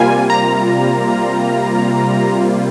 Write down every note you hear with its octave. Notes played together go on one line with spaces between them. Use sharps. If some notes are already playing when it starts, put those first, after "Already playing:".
Already playing: C3 G3 A#3 F4 G#5
A#5